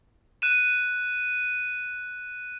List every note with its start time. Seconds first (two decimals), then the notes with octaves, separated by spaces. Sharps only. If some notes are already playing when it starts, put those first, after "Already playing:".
0.42 F#6 D#7 E7